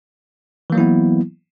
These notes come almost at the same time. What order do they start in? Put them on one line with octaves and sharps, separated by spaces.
E3 A#3 F#3 E4 B3